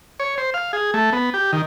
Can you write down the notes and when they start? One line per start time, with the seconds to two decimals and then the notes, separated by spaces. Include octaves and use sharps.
0.20 C#5
0.38 C5
0.54 F5
0.73 G#4
0.94 A3
1.13 B3
1.34 G4
1.53 D#3